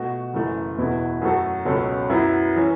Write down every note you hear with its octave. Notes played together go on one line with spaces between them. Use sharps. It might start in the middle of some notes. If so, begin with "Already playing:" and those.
Already playing: B2 A3 F#4
F#1 F#2 E3 A3
E1 E2 B2 B3 E4
F#2 F#3 A3 F#4 A4
C#2 B2 F#3 C#4 A4
F#2 F#3 B3 E4
E3 C#4